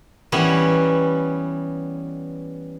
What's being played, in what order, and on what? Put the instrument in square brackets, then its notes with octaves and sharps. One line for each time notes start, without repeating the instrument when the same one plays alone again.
[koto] E3 G3 B3 C#4